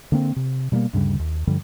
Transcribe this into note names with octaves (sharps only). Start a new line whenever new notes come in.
D3 A#3 C4
C3
B2 G3 A3 A#3
D2 G2 C#3 G3
D#2
G2 D3 F3 G3